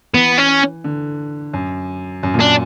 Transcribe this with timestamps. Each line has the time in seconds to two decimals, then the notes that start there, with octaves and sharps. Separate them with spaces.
0.14 E3 B3
0.38 C#4
0.84 D3
1.53 F#2
2.23 F#2
2.34 A#2
2.40 D4